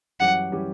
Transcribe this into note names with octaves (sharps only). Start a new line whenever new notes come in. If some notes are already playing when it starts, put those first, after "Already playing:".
F#2 E3 G3 C#4 G4 F#5
E3 G3 C#4 G4